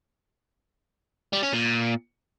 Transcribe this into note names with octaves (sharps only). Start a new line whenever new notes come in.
G3
C#4
A#2